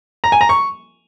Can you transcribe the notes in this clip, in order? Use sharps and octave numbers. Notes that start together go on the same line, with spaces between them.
A#5
G#5
A#5
C#6